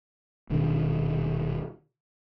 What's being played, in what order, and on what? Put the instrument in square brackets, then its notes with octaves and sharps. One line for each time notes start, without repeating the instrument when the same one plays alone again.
[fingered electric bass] D#1 B2 D#3 D4